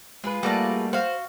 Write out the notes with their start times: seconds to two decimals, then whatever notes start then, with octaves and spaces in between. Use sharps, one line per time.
0.24 G#3 F4 G#4 B4
0.43 G3 A3 A#3 F#4 D5 A5
0.93 F#4 C5 F5